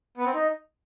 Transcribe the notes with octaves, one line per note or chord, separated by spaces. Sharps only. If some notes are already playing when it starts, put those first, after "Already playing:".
B3
C4
D#4